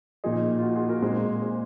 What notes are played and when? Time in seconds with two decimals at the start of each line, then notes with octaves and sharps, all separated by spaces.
0.24 A#2 F3 A#3 D#4 F4 G#4
0.58 F4
0.63 F#4
0.75 F4 G#4
0.88 F#4 A#4
1.01 A#2 G#3 C4 D#4 G#4 C5
1.41 G#4 C5